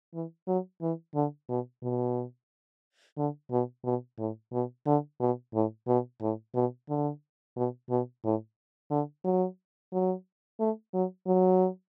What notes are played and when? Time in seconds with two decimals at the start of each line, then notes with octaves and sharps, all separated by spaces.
0.14 E3
0.48 F#3
0.81 E3
1.15 D3
1.49 B2
1.83 B2
3.17 D3
3.51 B2
3.85 B2
4.19 A2
4.52 B2
4.86 D3
5.20 B2
5.54 A2
5.87 B2
6.21 A2
6.55 B2
6.89 D3
7.56 B2
7.90 B2
8.24 A2
8.91 D3
9.25 F#3
9.93 F#3
10.60 A3
10.94 F#3
11.27 F#3